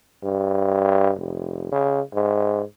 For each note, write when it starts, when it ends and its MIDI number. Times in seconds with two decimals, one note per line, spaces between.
0.24 1.12 43
1.19 1.67 29
1.72 2.01 49
2.14 2.63 44